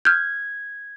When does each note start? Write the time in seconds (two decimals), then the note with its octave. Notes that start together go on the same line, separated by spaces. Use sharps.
0.05 F6 G6 G#6